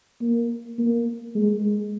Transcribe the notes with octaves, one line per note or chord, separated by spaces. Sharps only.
A#3
A#3
G#3